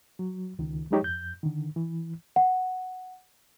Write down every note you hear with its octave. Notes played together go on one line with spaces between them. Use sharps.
F#3
C#2 D#3
F3 F#3 G#3 D#4 G4 C#5
F2 G6
D3 D#3
E3
F#5